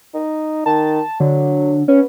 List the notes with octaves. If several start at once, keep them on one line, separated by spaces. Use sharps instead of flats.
D#4
D#3 A5
D3 F#3
B3 C#4